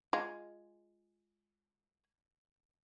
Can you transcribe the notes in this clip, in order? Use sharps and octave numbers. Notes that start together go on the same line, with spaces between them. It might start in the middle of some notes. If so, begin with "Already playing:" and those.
G#3 F4